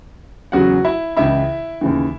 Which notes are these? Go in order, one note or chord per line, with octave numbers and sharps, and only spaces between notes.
E2 C#3 F#3 F#4 F#5
E4 E5
C#2 C#3 E3 E4 E5
D#2 C#3 E3